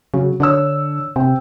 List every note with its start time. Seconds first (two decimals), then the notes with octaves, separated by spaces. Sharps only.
0.14 C#3 F#3
0.40 D3 D4 C#5 E6
1.16 C3 C4 G5